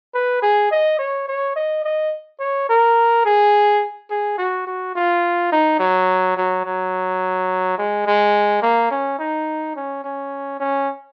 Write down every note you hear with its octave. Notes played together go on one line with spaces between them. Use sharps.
B4
G#4
D#5
C#5
C#5
D#5
D#5
C#5
A#4
G#4
G#4
F#4
F#4
F4
D#4
F#3
F#3
F#3
G#3
G#3
A#3
C#4
D#4
C#4
C#4
C#4